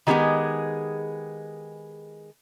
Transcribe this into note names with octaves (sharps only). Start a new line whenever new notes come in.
D#3 F#3 G#3 B3 G4 G#4